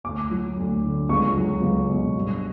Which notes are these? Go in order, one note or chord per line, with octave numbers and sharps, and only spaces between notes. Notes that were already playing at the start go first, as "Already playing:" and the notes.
D2 D6
F#3
D2
D3
C#2 C#6
F#3
C#2
B2
G2